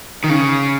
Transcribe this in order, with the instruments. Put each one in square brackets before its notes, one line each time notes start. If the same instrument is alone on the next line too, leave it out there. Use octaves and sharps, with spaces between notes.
[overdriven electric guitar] D#3
C#3